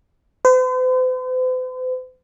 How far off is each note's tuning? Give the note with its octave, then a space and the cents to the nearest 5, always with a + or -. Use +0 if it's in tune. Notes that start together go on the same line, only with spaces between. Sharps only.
C5 -45